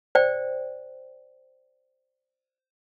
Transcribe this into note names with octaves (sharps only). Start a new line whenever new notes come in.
C5 D5 G5